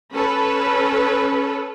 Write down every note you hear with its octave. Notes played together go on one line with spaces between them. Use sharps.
C#4 A4 B4